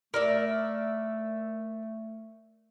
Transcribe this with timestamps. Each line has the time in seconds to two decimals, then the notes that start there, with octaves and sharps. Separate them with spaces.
0.14 A3 A#4 D5 E5